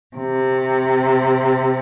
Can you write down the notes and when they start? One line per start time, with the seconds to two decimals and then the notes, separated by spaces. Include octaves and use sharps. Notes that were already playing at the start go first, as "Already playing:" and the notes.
0.17 C3